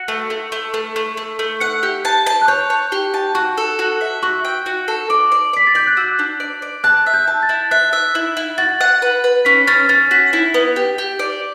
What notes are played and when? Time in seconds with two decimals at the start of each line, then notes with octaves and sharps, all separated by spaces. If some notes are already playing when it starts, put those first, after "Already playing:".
Already playing: F#4 C#7
0.08 A3
0.30 A3
0.52 A3
0.74 A3
0.96 A3
1.17 A3
1.39 A3
1.60 F#5 C#7
1.83 G4
2.05 A5
2.26 A5
2.42 F#6
2.48 C#5 G6
2.70 C#5
2.92 G4
3.14 A5
3.35 F#4 C#6
3.58 A4
3.79 F#4
4.01 E5
4.23 F#4 C#6
4.45 G5
4.66 F#4
4.88 A4
5.10 D5 D6
5.32 D5
5.53 D5 B6
5.67 A6
5.75 D5 G6
5.87 F#6
5.97 F#4 E6
6.19 D4
6.40 D5
6.62 D5
6.84 A5 F#6
7.06 E5
7.14 G6
7.27 A5
7.43 A6
7.49 E4
7.71 E5 F#6
7.93 E5
8.15 E4
8.37 E4
8.58 F#4 A6
8.81 F#5
9.02 B4
9.24 B4
9.45 C#4 B6
9.67 C#4 A6
9.89 C#4 A6
10.11 F#4 B6
10.33 E4
10.54 B3
10.76 G4
10.98 G4
11.19 D5